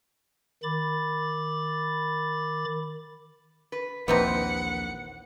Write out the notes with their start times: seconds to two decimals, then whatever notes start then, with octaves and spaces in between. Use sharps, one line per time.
0.63 D#3 B5 D6 A6
3.72 B4
4.08 A#1 D#2 E3 C4 D#4 B4 F#5